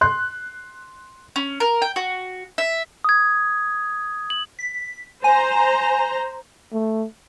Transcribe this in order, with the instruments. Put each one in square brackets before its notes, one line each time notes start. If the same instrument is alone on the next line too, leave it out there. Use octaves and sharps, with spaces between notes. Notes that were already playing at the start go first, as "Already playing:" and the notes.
[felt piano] C6 F#6
[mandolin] C#4
A#4
G5
F#4
E5
[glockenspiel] D#6 G#6
F#7
[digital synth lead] B6
[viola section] C5 A#5 [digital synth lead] G#5
[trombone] A3